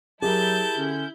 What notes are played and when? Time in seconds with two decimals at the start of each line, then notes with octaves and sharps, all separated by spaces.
0.22 F#3 E4 G4 G#4 A#4 A5 G6
0.77 D3 C#4